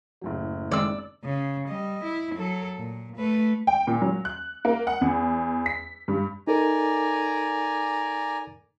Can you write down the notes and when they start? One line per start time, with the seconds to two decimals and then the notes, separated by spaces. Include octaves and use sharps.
0.21 F#1 A2 F#3
0.71 D#3 G#3 C4 D5 E6
1.25 C#3
1.68 G3 D#5
2.04 E4
2.35 F#3 A4
2.78 A#2
3.17 A3 B4
3.67 G5
3.87 A#2
4.02 F#3
4.25 F#6
4.65 A#3
4.87 F#5
5.01 E2
5.66 B6
6.08 G2
6.47 D#4 A4 A#4 D5 G#5 A#5